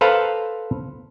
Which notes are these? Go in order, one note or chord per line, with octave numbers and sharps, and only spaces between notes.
A4 B4 C5 F5 A#5